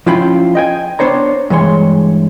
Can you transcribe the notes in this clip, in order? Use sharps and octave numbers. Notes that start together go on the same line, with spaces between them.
F3 C#4 E4 F4 G5 B5
D#5 G5 G#5
B3 D4 C5 C#5 A#5
G2 E3 G#3 C#5 C6